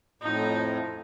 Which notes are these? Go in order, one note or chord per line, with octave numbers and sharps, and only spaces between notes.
F2 A2 F3 D#4